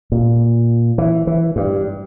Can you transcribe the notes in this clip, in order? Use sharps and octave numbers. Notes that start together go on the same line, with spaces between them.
A#2
E3
E3
G2